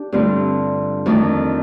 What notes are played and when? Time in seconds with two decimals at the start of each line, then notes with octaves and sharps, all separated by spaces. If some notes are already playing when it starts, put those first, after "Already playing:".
Already playing: D4 G4
0.12 G2 D3 A3 C4 F4
1.06 F2 D#3 A3 D4